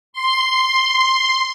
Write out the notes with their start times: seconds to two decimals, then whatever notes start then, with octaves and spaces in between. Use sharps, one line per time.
0.13 C6